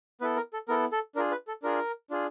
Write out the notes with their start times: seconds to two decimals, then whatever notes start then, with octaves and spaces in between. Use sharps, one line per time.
0.21 B3 E4 A4 B4
0.36 A#4
0.53 A4
0.68 B3 E4 A4 A#4
0.92 A4
1.15 D4 F4 G#4 A#4
1.31 B4
1.48 A4
1.63 D4 F4 G#4 A#4
2.10 D4 F4 G#4